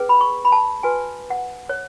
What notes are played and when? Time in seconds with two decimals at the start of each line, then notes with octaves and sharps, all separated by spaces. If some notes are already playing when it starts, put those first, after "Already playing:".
Already playing: C#4 G#4 B4
0.09 B5
0.21 C#6
0.45 B5
0.52 A5
0.83 F#4 B4 G#5
1.30 F#5
1.69 C#5